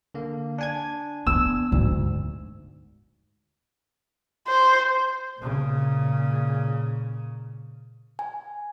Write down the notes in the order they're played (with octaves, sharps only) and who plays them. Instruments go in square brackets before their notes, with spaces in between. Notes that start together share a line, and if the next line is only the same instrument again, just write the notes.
[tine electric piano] D3 A#3
D4 G#5 G#6
[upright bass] B3 [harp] E6
[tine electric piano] D2 [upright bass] G#2
[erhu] C5
[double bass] A#2 C#3
[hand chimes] G#5